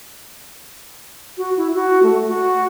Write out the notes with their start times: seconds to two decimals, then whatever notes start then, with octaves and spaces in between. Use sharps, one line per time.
1.38 F#4
1.57 E4
1.74 F#4
2.03 A3
2.28 F#4